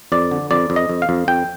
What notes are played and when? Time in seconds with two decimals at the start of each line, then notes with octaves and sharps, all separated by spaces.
0.12 F2 D5
0.31 D3
0.51 F2 D5
0.70 F2
0.76 D#5
0.90 F2
1.02 F5
1.09 F2
1.28 F2 G5